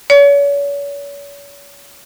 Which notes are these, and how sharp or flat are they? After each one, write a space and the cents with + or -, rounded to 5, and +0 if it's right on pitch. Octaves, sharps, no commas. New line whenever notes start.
C#5 +40